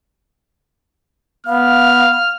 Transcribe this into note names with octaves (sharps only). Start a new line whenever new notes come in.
B3 F5 F6